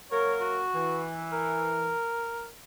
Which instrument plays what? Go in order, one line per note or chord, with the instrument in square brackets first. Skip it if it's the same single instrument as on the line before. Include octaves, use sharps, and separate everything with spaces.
[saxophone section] F#3 A#3 A#4 [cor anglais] C#5
[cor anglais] F#4
[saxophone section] E3
[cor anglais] A#4